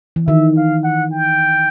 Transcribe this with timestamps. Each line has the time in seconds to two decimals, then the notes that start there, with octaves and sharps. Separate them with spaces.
0.16 E3
0.28 D#3 E5
0.57 F5
0.84 F#5
1.12 G5